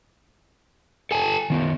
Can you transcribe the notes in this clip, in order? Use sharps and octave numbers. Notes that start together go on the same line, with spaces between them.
A4 G#5 A5
D#3 B3